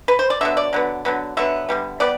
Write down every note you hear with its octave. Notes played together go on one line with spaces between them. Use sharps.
B4
C5
D5
D3 F#3 B3 E5
D5
D3 F#3 B3
D3 F#3 B3
D3 F#3 B3 E5
D3 G3 B3
G3 B3 D5